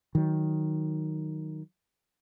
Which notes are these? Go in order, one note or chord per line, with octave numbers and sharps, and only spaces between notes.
D#3 F#3